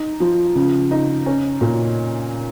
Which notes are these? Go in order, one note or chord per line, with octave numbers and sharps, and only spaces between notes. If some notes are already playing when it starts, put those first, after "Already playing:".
Already playing: D#4
F3
C#3
D#4
C#4
A#2